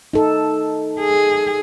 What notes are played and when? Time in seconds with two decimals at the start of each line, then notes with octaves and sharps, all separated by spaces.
0.13 D#4 A4
1.00 G#4